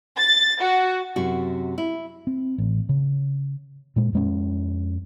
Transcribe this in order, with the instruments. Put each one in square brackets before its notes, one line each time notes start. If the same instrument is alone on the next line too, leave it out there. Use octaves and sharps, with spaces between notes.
[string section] A6
F#4
[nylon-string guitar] F#2 C3 F#4
E4
[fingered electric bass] C4
A1
C#3
A#2 G#3
F2 G#3 C#4